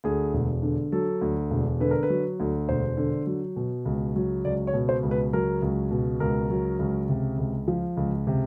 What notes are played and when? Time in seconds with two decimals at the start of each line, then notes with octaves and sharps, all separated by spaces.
0.04 D2 G#4
0.33 E1
0.62 D3
0.92 F#3 A4
1.21 D2
1.51 E1
1.80 D3 B4
1.91 A#4
2.03 B4
2.10 F#3
2.40 D2
2.68 E1 C5
2.97 D3
3.27 F#3
3.56 B2
3.85 C#2
4.16 F#3
4.45 C#2 D5
4.67 C#5
4.74 B2
4.89 C5
5.03 C#2
5.11 B4
5.33 F#3 A#4
5.62 C#2
5.91 B2
6.20 C#2 A#4
6.50 F#3
6.79 C#2
7.09 C3
7.38 C#2
7.68 F3
7.97 C#2
8.27 C3